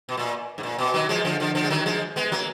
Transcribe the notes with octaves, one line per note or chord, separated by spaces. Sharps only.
B2
A#2
G#2
A#2
B2
D#3 F#3
F3 G#3
D3 F3
D3 F3
D3 F3
G#3
D#3 F#3
F3 G#3
G#3 B3
F#3 A#3